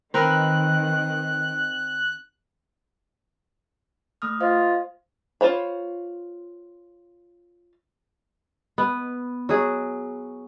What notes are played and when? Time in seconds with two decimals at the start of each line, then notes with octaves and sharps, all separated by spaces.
0.14 D#3 C4 A#4 B4 F#6
4.22 A3 D#6 F6
4.41 F4 C5 D#5 F5
5.41 F4 C5 C#5 B5
8.78 B3
9.49 F#3 F#4 G#4